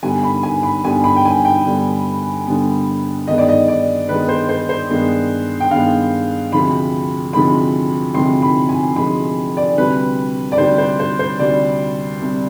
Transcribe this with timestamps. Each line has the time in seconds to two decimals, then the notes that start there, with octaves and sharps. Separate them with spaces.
0.03 G2 D3 G3 B3 G#5
0.23 B5
0.43 G#5
0.63 B5
0.83 G2 D3 G3 B3 G#5
1.04 B5
1.16 G5
1.25 G#5
1.45 G5
1.65 G2 D3 G3 B3
2.47 G2 D3 G3 B3
3.27 G2 D#3 G#3 B3 D#5
3.38 D5
3.49 D#5
3.68 D5
4.09 G2 D#3 G#3 B3 B4
4.29 C5
4.49 C5
4.69 C5
4.90 G2 D#3 G#3 B3
5.60 G5
5.71 G2 D#3 G#3 B3 F5
6.52 D2 C3 F3 G#3 C4 B5
7.33 D2 C3 F3 G#3 C4 B5
8.14 D2 C3 F3 G#3 C4 C6
8.42 B5
8.69 G#5
8.96 D2 C3 F3 G#3 C4 B5
9.57 D5
9.77 D2 C3 G3 B4
10.52 D5
10.58 D2 C3 G3 C5
10.78 C5
10.99 C5
11.19 C5
11.39 D2 C3 G3 D5
12.21 C3 G3